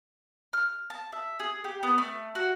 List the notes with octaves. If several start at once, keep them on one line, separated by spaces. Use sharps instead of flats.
F6
A5
E5
G#4
G4
B3
A3
F#4